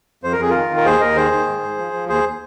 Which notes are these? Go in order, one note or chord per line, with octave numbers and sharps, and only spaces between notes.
F2 C5
A#4
F2 G#4
D#3 F4 A#4
D#3
A#4
D#2 G#4 C5
D#2 A#4 D#5
D#3 G#4 C5
D#3
G#2
G#2
F3
F3
D#2 G#4 C5